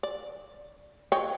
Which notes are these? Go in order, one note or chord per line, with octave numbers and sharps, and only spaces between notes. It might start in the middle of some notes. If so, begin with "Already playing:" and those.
D5
C#5 D#5 G5